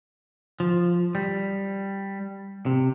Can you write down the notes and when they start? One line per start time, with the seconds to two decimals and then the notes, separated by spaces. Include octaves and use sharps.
0.60 F3
1.15 G3
2.66 C3